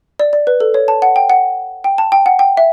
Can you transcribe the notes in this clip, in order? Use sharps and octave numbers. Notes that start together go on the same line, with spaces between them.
D5
D5
B4
A4
C#5
A5
F#5
G5
F#5
G5
A5
G5
F#5
G5
E5